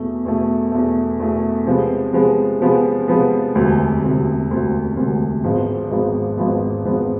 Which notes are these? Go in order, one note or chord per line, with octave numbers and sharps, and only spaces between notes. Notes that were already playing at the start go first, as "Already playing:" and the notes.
Already playing: E2 B2 A3
E2 B2 A3
E2 B2 A3
E2 B2 A3
C3 F3 G#3 B3
C3 F3 G#3 B3
C3 F3 G#3 B3
C3 F3 G#3 B3
E1 D2 C3
E1 D2 C3
E1 D2 C3
E1 D2 C3
G#1 G#2 F3 B3
G#1 G#2 F3 B3
G#1 G#2 F3 B3
G#1 G#2 F3 B3